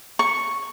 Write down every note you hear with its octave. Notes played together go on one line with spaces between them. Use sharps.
C#6